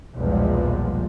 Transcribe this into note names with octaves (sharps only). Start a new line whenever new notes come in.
B1 E2 G2 A#2 F3 G#3